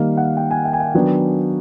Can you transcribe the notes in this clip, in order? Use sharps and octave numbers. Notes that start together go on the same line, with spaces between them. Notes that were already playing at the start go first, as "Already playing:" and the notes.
Already playing: D#3 G3 A#3 F5
F#5
G5
G#5
G5
G#5
G5
D#3 F#3 B3 D4